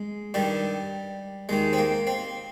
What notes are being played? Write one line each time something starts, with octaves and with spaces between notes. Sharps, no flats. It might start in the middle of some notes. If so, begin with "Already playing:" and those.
Already playing: G#3
G2 D#3 G3
D#2 D#3 G#3
C4
A#3
C4